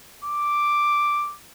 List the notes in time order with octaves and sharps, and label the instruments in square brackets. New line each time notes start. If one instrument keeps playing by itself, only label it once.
[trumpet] D6